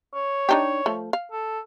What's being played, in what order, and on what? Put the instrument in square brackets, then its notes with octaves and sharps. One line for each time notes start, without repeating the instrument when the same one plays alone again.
[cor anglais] C#5
[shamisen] D4 D#4 G4
F3 A3
F5
[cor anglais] A4